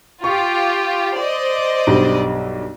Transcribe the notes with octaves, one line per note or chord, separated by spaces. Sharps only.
F4 G4 C#6
C5 D5 D#5
B1 G2 G3